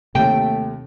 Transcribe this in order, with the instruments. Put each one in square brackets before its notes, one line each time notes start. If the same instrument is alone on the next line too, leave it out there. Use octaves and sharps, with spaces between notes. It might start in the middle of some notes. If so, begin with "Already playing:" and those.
[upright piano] D#2 [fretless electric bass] C3 D#3 [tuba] A3 [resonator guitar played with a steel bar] G5